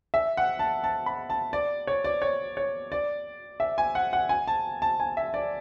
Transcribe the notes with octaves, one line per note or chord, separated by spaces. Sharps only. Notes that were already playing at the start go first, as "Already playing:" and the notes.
E5
F#5
A5
A5
B5
A5
D5
C#5
D5
C#5
C#5
D5
E5
G#5
F#5
F#5
G#5
A5
A5
G#5
E5
D5